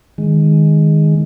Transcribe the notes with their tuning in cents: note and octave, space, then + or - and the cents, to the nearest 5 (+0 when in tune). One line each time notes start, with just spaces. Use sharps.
D#3 +5 G#3 +0